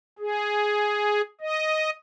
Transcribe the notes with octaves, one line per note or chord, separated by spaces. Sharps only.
G#4
D#5